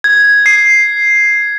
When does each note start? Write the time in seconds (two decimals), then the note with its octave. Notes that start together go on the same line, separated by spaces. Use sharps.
0.04 G#6
0.46 C7